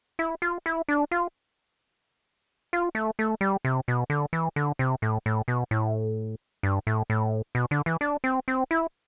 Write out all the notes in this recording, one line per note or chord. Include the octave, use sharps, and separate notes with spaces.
E4
F4
E4
D4
F4
F4
A3
A3
G3
C3
B2
D3
E3
D3
C3
A2
A2
B2
A2
G2
A2
A2
B2
D3
E3
D4
C4
C4
E4